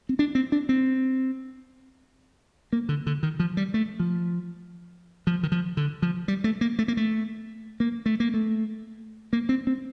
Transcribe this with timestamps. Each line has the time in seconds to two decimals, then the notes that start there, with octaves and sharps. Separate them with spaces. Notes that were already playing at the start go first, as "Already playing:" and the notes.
0.09 C4
0.19 D4
0.35 C4
0.52 D4
0.69 C4
2.73 A#3
2.89 D3
3.07 D3
3.23 D#3
3.40 F3
3.57 G3
3.74 A3
4.00 F3
5.27 F3
5.43 D#3
5.52 F3
5.77 D3
6.02 F3
6.28 G3
6.44 A3
6.61 A#3
6.79 A3
6.88 A#3
6.97 A3
7.80 A#3
8.06 A3
8.20 A#3
8.34 A3
9.33 A#3
9.49 C4
9.67 C4